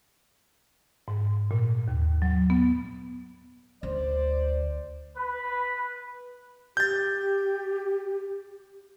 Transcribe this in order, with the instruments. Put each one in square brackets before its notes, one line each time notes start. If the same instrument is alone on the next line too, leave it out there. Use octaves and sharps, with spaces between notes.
[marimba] G#2
A#2
D#2
F#3
B3
[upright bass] D2 [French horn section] C5 D5
[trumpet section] B4
[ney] G4 [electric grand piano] G6 A6